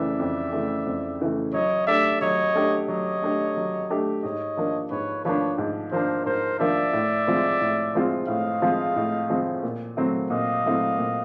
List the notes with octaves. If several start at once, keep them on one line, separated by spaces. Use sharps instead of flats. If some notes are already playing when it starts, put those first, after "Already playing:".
Already playing: F2 C#3 E3 A3 D5 E5
F2
C#3 E3 A3
F2
C#3 E3 A3
F#3 C#5 D#5
A3 D4 G4 D5 E5
F#3 C#5 D#5
A3 D4 G4
F#3 C#5 D#5
A3 D4 G4
F#3
A3 D4 G4
G#2 C#5 D#5
F3 A#3 D4
G#2 B4 C#5
F3 A#3 D4 B4 C#5
G#2
F3 A#3 D4 A#4 C5
G#2 A#4 C5
F3 A#3 D4 D5 E5
A2
F3 G#3 C4 F4
A2
F3 G#3 C4 F4
A2 D#5 F5
F3 G#3 C4 F4
A2
F3 G#3 C4 F4
A#2
F#3 A3 C4 E4
A#2 D#5 F5
F#3 A3 C4 E4
A#2